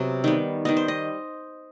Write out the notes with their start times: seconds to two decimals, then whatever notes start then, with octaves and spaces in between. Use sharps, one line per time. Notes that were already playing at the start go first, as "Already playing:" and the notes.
Already playing: C3 F#3 B3
0.24 D#3 G3 B3
0.65 D#3 G3 B3 D#5
0.77 C5
0.88 D#5